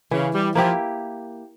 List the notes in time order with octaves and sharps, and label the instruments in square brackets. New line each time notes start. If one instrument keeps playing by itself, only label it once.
[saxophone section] C#3 [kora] E3
[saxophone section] G3
[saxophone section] F3 [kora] A#3 E4 G4